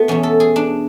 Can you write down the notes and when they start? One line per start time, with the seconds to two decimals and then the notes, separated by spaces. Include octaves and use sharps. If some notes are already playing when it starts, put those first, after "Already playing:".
Already playing: A3 B3
0.08 E2 B2 C#4
0.23 A4
0.40 G#4
0.56 D4